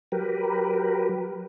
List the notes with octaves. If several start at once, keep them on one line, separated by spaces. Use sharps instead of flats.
F#3 G4 A#4 B4